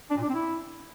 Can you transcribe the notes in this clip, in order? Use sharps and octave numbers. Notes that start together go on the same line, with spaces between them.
D4
A#2
D4
C4
E4